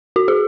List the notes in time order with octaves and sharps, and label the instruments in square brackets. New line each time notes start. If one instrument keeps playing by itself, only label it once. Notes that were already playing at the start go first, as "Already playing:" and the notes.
[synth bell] F#4
G#4